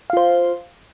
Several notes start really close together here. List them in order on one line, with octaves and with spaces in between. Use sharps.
F5 F4 C5